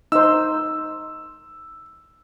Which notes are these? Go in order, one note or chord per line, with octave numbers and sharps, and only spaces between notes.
D#4 C5 E6